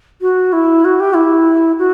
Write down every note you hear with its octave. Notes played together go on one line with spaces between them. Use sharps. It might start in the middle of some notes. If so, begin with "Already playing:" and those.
F#4
E4
F#4
G4
E4
F#4